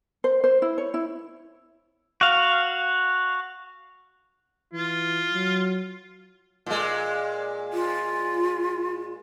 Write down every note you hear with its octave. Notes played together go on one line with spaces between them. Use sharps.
C5
C5
E4
C#5
E4
F#4 F5
E3 F4
F#3
A#2 G#3
F4